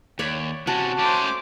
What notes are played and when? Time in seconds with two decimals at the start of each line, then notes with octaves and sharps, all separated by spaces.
0.19 D#2 C#5 D5 B5
0.67 C3 C#4 F#4 A5
0.99 A3 C#4 C5 D6